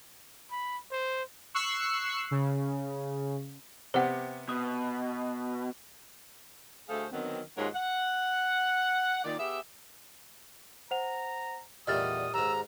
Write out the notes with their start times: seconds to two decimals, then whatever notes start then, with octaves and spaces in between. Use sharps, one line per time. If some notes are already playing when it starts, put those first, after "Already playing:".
0.51 B5
0.92 C5
1.54 C#6 E6 F#6 C7
2.31 C#3
3.94 C3 B3 G4 C5 F#5
4.49 B2 D#6
6.88 D2 A3 G#4 A4 C5 F5
7.11 D3 D#3 F#3 B3 C4
7.56 D#2 G#2 F4 A#4 C#5 F#5
7.74 F#5
9.24 A#2 D#3 D5
9.38 B3 G4 G#4 E5
10.91 C5 F#5 A#5 F7
11.87 E2 A#2 G3 A3 D#5 D#6 F6 A6
12.34 D#2 G#2 A#5 E6